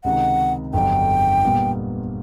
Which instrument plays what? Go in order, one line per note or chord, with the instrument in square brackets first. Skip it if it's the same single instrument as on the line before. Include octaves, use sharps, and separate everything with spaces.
[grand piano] C#2 C3 D#3 [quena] F#5
[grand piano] G1 F2 D3 F#3 [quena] G5
[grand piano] A#2 G3 B3